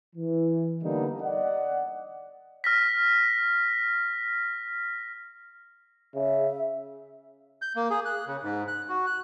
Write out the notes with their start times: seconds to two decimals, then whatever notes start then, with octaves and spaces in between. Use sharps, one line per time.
0.16 E3
0.83 D3 G3 A#3 B3 D#4
1.21 D5 D#5 F#5
2.64 F6 A#6 B6
6.15 C#3 E5
7.62 G6
7.76 A#3
7.90 G#4
8.05 F#6
8.27 C#3
8.43 G#2
8.68 F#6
8.89 F#4
9.07 F#6